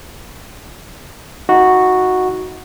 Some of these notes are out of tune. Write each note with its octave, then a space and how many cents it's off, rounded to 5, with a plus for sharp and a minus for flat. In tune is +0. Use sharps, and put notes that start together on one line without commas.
D#4 +25 F#4 -5